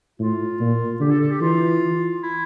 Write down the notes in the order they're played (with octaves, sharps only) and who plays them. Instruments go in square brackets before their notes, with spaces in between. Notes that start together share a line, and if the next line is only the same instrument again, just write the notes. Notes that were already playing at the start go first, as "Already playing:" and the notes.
[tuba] A2 [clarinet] F4
[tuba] A#2
[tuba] D3 [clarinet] G4
[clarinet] A4
A4
G4
[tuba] E3 [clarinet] F4
[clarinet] E4